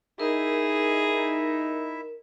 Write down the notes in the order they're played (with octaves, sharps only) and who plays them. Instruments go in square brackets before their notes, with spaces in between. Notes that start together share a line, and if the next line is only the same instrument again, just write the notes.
[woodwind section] D#4 [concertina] E4 E5 [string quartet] G#4 [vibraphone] A#4